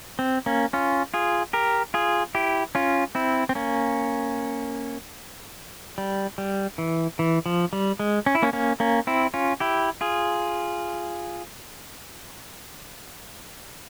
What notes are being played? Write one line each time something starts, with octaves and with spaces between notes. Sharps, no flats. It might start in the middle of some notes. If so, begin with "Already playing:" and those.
C4
A#3 C#4
C#4 F4
F4 G#4
G4 A#4
F4 G#4
E4 G4
C#4 F4
C4 E4
C4
A#3 C#4
G3
G3
E3
E3
F3
G3
G#3
C#4
E4
A#3 C#4
A#3 C#4
A#3 C#4
C4 E4
C#4 F4
E4 G4
F4 G#4